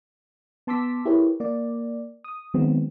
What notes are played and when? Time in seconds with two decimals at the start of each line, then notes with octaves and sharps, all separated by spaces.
0.67 B3 A5 C6 D6 E6 B6
1.05 E4 G4 G#4 A#4 B4 C#5
1.40 A#3 D5
2.24 D#6
2.54 D#3 F#3 G#3 B3 C4